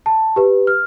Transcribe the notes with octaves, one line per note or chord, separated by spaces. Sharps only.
A5
G4 B4
F6